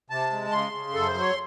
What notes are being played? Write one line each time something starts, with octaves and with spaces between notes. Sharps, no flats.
C3 A5
G#3
C#3 C6
C#3
F#2 A4
C5
F#3
C#5